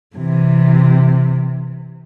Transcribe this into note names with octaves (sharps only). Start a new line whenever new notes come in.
C3 E3